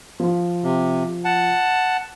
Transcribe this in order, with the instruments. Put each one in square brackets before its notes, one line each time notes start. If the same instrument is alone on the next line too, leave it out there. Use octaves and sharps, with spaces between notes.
[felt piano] F3 F4
[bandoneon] C3
F#5 A5